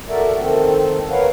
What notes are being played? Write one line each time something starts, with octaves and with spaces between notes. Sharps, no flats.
F#4 A4 A#4 D5 E5
D#3 C4 A4
A#4 B4 C#5 F5 F#5